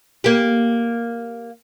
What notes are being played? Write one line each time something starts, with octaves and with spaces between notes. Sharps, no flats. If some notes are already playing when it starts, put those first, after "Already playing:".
A#3 G4